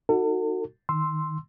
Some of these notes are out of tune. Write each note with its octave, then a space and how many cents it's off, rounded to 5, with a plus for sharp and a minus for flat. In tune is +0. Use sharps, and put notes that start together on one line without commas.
D#4 +0 F#4 +0 A4 +40
D#3 +0 C6 +0 E6 +0